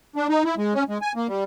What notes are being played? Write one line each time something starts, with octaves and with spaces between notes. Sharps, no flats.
D4
D#4
E4
G#3
C#4
G#3
G#5
A#3
G3